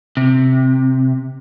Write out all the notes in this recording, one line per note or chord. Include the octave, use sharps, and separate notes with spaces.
C3